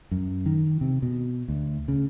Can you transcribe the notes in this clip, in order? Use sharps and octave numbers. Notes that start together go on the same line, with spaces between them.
F#2
D#3
C3
B2
D2
C#3